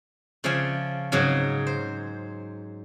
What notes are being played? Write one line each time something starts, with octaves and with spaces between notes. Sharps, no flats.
C#3 F3 D5 E5 G#5
G#2 C#3 F#3 G#4
C5